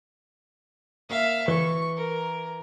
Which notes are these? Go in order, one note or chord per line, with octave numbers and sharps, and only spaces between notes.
A#3 E5 F5
E3 C#6
A#4